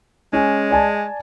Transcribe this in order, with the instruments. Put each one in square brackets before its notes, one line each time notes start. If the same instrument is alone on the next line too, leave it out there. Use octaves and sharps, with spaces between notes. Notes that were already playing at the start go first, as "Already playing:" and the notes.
[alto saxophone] G#3 [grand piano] C#4
[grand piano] D5 G#5 A5